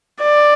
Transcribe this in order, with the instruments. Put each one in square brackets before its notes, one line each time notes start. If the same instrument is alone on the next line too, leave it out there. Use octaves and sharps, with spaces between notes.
[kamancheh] D5